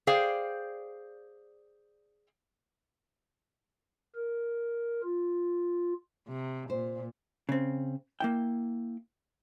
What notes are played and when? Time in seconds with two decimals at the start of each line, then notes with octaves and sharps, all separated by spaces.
0.07 G#4 C5 D5 F5 G5
4.16 A#4
5.03 F4
6.28 C3
6.70 A#2 C5
7.49 C#3 C4
8.20 A#3 E4 G5